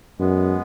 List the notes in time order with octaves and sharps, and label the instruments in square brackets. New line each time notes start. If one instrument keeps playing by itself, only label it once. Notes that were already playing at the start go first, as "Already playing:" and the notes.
[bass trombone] F#2 [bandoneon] G#3 B3